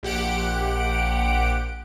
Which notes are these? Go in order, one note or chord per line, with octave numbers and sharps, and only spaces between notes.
A#1 G4 F#5 D7